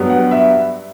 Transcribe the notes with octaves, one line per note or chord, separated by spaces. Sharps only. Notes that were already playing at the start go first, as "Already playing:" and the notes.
Already playing: G2 F#3 B3
F#5
E5